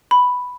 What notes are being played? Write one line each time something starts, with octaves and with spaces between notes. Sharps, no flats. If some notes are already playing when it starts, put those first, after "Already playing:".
B5